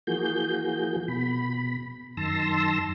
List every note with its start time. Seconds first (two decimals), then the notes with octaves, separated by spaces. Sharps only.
0.07 E3 F3 A#3 F#4 G#4 G6
1.08 B2 B5
2.17 F#2 D#3 A5 C6 E6 A#6